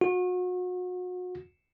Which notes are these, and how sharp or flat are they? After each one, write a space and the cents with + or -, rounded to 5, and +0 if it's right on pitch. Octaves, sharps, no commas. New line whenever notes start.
F#4 -35